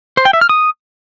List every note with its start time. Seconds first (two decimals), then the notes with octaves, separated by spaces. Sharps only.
0.17 C5
0.25 G5
0.33 E5
0.41 F6
0.49 D#6